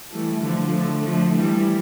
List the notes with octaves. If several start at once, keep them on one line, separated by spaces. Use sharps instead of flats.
E3 G3 A3
D3 F3
D3 A3
D3 F3
E3 G3